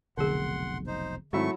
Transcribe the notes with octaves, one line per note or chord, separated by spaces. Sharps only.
F1 B1 D3 G#4 F#5 C6
D#4 C5
G#2 D#3 F#3 A3 C4 E4 E5 C#6